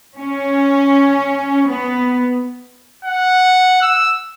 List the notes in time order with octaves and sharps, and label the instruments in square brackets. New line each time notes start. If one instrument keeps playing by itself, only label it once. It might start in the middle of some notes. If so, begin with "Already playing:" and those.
[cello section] C#4
B3
[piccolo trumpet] F#5
E6